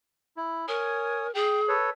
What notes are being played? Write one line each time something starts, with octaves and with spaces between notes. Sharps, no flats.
E4
A#4 C#5 G#5 D#6
G#4 G5
A4 B4 C#5